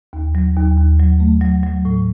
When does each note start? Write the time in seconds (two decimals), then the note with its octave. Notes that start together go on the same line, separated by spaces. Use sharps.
0.13 D#2
0.35 F#3
0.56 D#2
0.77 D#2
0.99 F#3
1.20 A3
1.41 F#3
1.63 F#3
1.85 A2